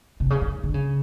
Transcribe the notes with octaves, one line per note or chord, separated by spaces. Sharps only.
C3
C#3
D#3
D3
C#3